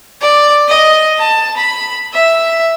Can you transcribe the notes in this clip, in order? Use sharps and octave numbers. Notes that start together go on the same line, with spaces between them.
D5
D#5
A5
B5
E5